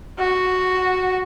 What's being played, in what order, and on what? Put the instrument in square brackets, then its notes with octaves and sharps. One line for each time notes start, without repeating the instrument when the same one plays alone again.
[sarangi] F#4